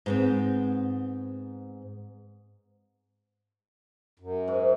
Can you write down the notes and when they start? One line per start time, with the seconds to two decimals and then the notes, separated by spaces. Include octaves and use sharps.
0.06 G#2 B3 C4
4.20 F#2
4.48 G#2